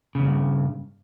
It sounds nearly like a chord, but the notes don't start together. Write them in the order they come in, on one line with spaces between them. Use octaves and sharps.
C#3 E2 G2